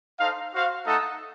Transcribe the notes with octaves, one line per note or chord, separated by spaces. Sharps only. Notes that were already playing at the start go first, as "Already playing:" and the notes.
D#4 A4 C5 F5
F#4 C5 F5
A3 D#4 A4 D#5 F#5